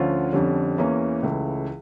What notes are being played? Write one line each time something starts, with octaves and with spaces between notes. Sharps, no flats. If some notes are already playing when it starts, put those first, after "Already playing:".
Already playing: D2 D3 F3 C#4 F4
F2 D3 G3 C#4
E2 E3 A#3 C#4
C#2 C#3 E3 A3